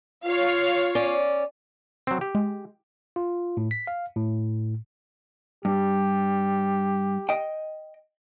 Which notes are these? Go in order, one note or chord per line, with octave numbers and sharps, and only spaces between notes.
F4 C#5 F5
C#4 D5
F#3 C4
G4
G#3
F4
A2
B6
F5
A2
G2 G4
D#5 G5